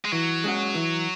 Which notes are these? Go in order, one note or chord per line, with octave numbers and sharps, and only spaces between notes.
G#3
E3 F#3
G#3 C#4 F#4
E3